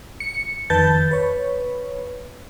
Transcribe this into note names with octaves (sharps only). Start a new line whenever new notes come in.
C#7
F2 D#3 B4 A5 G6 A6
B4 C#5